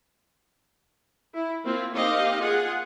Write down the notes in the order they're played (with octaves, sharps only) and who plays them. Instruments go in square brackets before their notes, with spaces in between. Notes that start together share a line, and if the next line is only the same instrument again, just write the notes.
[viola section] E4
A#3 C4 E4 F4
A#3 C4 D#4 G4 D#5 F5
F4 G#4 F#5